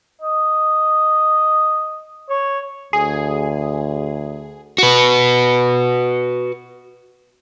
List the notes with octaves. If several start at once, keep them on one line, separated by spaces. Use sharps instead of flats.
D#5
C#5
D2 G#4
F#4 B4